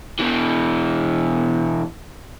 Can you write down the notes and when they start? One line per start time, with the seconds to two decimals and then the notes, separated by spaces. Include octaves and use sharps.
0.19 B2 E3